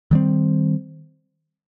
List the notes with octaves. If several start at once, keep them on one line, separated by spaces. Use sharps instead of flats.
D#3 G3 C4